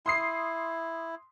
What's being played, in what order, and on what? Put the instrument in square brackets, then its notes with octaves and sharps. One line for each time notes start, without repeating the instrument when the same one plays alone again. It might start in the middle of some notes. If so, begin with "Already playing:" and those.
[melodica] E4 [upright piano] C6 D#6 C7